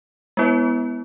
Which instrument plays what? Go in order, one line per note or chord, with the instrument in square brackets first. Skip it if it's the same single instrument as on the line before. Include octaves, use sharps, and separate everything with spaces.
[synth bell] G#3 B3 E4 B4